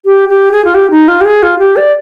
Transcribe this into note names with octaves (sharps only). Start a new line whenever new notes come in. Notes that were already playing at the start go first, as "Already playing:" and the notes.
G4
G4
G#4
F4
G4
D#4
F4
G4
G#4
F4
G4
D5